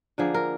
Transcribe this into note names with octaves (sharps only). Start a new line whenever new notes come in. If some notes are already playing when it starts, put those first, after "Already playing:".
D3 F3 A#3 G#4
A#4